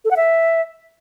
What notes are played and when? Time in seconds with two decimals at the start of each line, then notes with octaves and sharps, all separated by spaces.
0.05 A4
0.11 F#5
0.17 E5